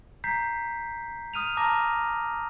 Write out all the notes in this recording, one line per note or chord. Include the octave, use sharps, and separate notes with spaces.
A#5 G6 B6 C7
D#6 F6 D#7 F7
A5 A#5 D6 F6 A#6